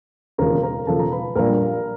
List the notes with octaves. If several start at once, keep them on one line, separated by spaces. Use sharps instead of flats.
E1 D#2 C#3 F3 A#4 A#5
A#4 A#5
E1 D#2 C#3 F3 A4 A5
A#5
B4 B5
A#1 A#2 G3 A#4 A#5